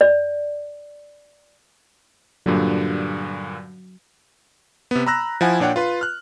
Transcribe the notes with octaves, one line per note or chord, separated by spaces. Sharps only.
D5
G2 A#2 D3 F#3
C3 B3
A#5 B5 E6 F#6 A#6
F3 E4 F#5 G#5
A#2 D4 C#5 F#5 G5
F4 B4 C6
F6 F#6